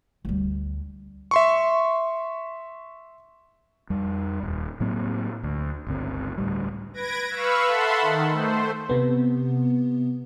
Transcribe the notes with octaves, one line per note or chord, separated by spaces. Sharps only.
D2 G3
E5 C6 C#6
F2 G3
D#1
A2 F#3 A#3 C4
D2
G1 C#2 C4
D2 A2 G3
B4 G#6 A#6 D7
B4 F5 B5 C#6 E6
A4 E5 F#5 A5 B5 C6
D#3
A3 C5
C3 B3